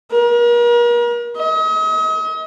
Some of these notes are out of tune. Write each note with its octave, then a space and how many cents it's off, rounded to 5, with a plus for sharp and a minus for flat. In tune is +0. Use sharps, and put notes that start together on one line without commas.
A#4 +40
D#5 +40